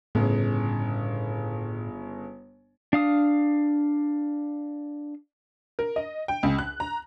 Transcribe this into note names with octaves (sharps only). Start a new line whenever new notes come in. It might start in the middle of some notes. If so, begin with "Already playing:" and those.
G1 A2 C#3
D4 F5 D#6
A#4
D#5
G5
C#2
F#6
A#5